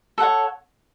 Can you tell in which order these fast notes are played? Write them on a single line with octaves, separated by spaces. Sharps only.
A4 F#5 C#5